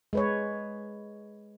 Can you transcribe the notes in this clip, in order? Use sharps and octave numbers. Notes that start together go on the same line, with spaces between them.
G#3 B4 C#5